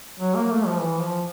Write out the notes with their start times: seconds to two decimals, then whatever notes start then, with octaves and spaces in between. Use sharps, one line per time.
0.19 F#3
0.35 A#3
0.50 A3
0.66 F3
0.80 E3
1.01 F3